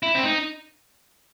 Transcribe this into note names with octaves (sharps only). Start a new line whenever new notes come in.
E4
C4
D#4